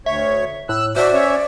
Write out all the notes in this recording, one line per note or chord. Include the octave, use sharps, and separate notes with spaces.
D2 C#5 E5
A2 E6 F#6
F#4 C5 D5 E5
C#4 C#5 E5